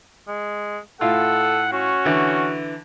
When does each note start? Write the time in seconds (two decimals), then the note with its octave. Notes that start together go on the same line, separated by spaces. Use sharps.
0.28 G#3
1.01 A2 F4 A4 F#5
1.73 C#4 F#4
2.05 D3 E3